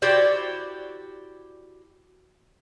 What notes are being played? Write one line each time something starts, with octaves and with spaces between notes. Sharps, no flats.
E4 F#4 G4 C5 D5